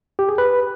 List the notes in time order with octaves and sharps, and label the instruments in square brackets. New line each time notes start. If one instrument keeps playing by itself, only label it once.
[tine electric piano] G4
G#4
B4